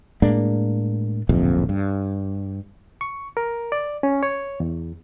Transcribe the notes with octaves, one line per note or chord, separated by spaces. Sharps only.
A2 G#3 A#3 D4
D1 A#1 F2 C3
G2
C#6
A#4
D5
C#4
C#5
E2